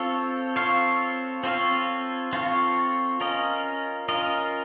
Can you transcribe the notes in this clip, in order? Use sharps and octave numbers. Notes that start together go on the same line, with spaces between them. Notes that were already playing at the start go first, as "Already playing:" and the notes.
Already playing: C4 F4 A4 C#5 F5
C4 F4 A4 C#5 F5
C4 F4 A4 C#5 F5
C4 F4 A4 C#5 F5
C#4 F4 A#4 D#5
C#4 F4 A#4 D#5